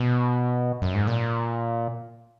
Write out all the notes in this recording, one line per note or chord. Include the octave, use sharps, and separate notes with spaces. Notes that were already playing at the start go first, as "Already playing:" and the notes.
Already playing: B2
F#2
G#2
A#2